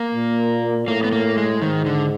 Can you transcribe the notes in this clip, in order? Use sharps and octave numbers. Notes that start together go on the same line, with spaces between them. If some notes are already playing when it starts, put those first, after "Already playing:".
Already playing: A#3
A#2
A2 A#3
B3
A#3
G#3
G#2 D#3
D3